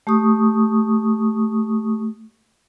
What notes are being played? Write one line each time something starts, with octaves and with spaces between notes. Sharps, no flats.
A3 G4 C#6 D#6